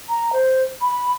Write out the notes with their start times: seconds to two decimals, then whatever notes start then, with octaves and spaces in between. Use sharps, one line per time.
0.09 A#5
0.33 C5
0.82 B5